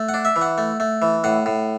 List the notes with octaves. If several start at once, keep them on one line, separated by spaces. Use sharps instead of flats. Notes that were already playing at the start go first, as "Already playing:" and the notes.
Already playing: A3
F#5
D4
E5
E3
F#5
A3
A3
E3
A2 F#5
A2